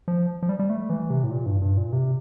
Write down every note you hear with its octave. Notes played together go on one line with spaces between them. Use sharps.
F3
F3
G3
G3
A3
E3
C3
A2
A#2
G2
G2
A#2
C3